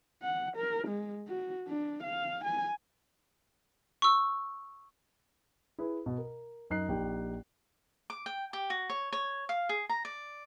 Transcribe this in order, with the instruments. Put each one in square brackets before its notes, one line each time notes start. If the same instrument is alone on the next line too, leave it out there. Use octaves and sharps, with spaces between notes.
[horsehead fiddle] F#5
A#4
G#3
F#4
D4
F5
G#5
[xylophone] C#6 E6
[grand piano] E4 G#4 B4
B2
A#4
F#2 D#4 F#6 C7
A#1 D#4 G4 G5
[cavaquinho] D6
G5
G4
F#4
C#5
C#5
F5
G#4
A#5
D5